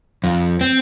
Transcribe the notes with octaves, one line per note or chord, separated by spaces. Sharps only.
F2
C4